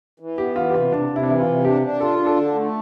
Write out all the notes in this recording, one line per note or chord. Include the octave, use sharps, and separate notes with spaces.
E3
B3 G4
E3 F4
G4
C3 F4
C3 D4
C3
E4
D4
E3 E4
F4
C3
D4 G4
D4
F4 A4
D4
A4
D3
A3